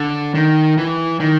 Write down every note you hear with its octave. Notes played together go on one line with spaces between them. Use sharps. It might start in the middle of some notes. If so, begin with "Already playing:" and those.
Already playing: D3
D#3
E3
D#3